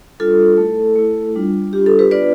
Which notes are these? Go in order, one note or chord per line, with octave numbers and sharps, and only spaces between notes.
G3 D4 F4 A4
A3 E4
A3 E4
G3 D4 F4
G3 D4 F4 G4
A4
G4 B4
B3 D4 F4 B4 D5